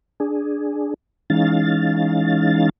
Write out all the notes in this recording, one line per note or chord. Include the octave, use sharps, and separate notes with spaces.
D4 G#4
E3 G#3 C#4 D#4 F5 A6